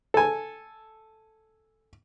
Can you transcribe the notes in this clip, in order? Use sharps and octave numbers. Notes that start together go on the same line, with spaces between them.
A4 G#5